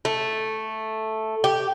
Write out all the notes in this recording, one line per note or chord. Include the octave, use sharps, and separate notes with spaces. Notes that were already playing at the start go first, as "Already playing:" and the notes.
A3
G4